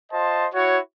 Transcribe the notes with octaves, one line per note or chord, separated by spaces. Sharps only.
F4 C5 D#5 A5
E4 F#4 C#5